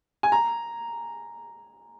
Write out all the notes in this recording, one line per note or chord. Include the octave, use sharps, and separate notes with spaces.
G#5
A#5